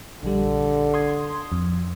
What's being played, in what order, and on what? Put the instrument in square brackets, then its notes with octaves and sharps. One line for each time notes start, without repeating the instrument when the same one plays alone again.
[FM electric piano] A#1 G3 [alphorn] D3
[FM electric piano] C6 D#6 G#6
F2